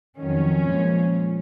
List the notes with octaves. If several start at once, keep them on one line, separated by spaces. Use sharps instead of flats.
F2 D#3 F#3 C#4
A#2 F3 G#3